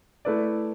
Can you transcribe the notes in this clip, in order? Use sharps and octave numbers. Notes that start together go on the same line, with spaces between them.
A3 E4 B4 D5